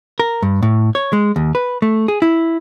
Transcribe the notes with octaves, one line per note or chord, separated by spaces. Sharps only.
A#4
G2
A2
C#5
G#3
D#2
B4
A3
G#4
E4